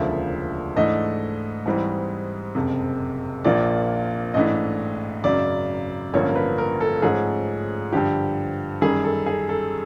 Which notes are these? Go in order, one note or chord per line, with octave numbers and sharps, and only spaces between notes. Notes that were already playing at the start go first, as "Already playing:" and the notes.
Already playing: E1 D2 C#3 F3 A#3 E5
G#2 E3 A3 D4 D#5
G#2 E3 G3 C4
F#1 F2 C3
A#1 A#2 F3 A#3 D5
A1 G#2 E3 A3 D4 D#5
G#1 F#2 C#3 F#3 D5
A1 G2 D3 F3 A#3 C#5
A#4
B4
A#4
A4
G#2 F3 A3 C#4 G#4
G2 D3 F3 G4
F#2 D#3 G3 G#4
A4
G#4
A4